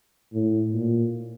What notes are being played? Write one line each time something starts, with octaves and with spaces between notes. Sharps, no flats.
A2
A#2